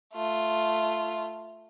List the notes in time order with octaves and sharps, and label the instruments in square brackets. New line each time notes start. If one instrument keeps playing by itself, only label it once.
[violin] A3 F4